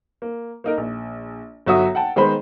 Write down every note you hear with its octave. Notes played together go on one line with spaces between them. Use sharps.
A#3
A#3 D#4 A#4
A#1
G1 F#3 F#4 E5 D#6
F#5 G5 A5
D#3 G#3 B3 C5 B5